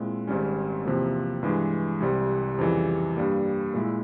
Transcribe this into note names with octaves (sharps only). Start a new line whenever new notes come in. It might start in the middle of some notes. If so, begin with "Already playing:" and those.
Already playing: A#2 G#3 C4 E4
G#1 G#2 G3 C#4
E2 C3 F3 A#3
G2 E3 G#3
C2 C3 G3
F2 C#3 E3 G3
G2 G3 A#3
A#2 G#3 E4